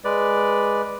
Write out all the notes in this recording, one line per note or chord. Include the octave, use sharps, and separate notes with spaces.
G#3 B4 D5